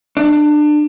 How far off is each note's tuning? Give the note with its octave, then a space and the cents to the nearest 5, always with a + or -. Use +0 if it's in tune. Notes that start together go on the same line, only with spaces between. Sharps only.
D4 +25